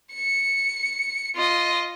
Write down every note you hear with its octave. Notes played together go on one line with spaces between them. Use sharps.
C#7
F4 D#5